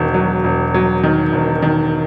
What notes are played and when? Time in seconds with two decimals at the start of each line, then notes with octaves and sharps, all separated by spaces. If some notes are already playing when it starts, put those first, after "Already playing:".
Already playing: E1 D#3
0.14 F#3
0.44 E1
0.74 F#3
1.03 D#3
1.33 E1
1.62 D#3